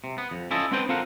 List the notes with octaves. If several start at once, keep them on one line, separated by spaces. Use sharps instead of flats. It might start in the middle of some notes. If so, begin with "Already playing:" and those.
C3
B3
F2
C#4 E4 F4 A4 D#5
B3 C4 D4 B4 C5 G5
C4 F4 A4 A#4 F#5